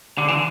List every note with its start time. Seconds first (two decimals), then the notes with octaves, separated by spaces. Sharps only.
0.18 D3
0.28 E3